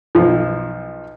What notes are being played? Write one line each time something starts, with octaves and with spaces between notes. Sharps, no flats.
B1 F3